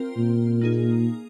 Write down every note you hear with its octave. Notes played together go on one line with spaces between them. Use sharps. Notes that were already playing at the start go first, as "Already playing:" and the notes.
Already playing: C4 F4 A#4
A#2
A#3 D#4 G#4